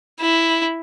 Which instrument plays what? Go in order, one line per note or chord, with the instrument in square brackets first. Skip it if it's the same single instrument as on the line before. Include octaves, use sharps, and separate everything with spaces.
[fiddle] E4